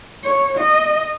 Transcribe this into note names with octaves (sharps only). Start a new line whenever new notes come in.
C#5
D#5